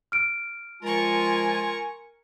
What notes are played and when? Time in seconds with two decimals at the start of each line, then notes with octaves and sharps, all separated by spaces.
0.12 F6 D7
0.83 F3 G#3 F4 A#4 G#5 C#6